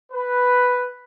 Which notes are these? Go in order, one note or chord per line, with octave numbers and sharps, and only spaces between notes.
B4